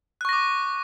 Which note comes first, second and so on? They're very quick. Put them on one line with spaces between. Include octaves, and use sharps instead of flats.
F#6 C#6 A#6 D6